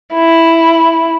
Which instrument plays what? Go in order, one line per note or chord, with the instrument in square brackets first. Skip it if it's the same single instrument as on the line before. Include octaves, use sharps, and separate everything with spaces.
[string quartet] E4